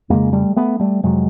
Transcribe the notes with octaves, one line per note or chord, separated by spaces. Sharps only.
F2 C#3 G#3 A#3
G3 A3
A3 B3
G3 A3
F2 C3 F#3 G#3